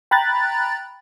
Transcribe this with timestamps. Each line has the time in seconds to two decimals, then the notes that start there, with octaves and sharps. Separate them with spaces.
0.11 G5 A#5 B5 F#6 A6